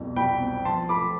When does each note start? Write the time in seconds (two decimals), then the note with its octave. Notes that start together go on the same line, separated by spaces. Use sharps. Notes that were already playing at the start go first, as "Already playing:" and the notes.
Already playing: C2 F2 B2
0.16 C2 G5 B5
0.40 C4
0.65 F3 A5 C6
0.89 A3 B5 D6